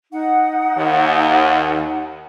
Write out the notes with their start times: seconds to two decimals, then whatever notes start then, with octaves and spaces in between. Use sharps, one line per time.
0.12 D#4 F#5
0.77 D#2